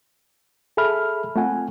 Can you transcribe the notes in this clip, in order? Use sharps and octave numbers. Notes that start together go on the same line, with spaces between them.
G#4 A4 E5 B5 F6
A3 C4 F4 F#5 G#5